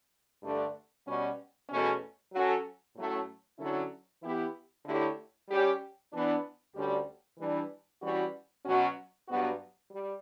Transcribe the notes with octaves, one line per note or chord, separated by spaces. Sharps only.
G2 D3 A3 D4
B2 G3 C#4 F#4
E2 B2 A3 C#4
F#3 C#4 F#4 A4
A2 F#3 A3 C#4
D3 F#3 C#4 E4 A4
E3 B3 E4 G4
D3 A3 E4 G4 C#5
G3 C#4 G4 C#5
E3 B3 D4
D2 D3 G3 C#4 G4
E3 G3 D4
E3 G3 C#4 F#4
B2 F#3 C#4 F#4
G2 F#3 B3 F#4
G3